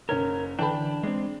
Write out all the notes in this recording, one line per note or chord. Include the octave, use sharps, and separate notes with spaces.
F#1 C#4 A#4 G#6
D3 E3 D4 G5 A5 B5
G#3 C4 D4